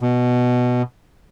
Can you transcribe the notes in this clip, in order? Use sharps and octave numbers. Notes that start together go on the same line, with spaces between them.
B2